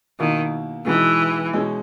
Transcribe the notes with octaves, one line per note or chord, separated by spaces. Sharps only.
B2 D#3 A#3 E4
B2 E3 G#3 B3 D#4
B2 G#3 C#4 E4